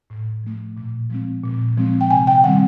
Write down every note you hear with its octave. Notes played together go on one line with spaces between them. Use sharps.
A2
F3 A3
A#2
F3 G#3 C4
A#2
F3 G#3 C4
G5
C3 G#5
G5
D#3 G3 C4 F#5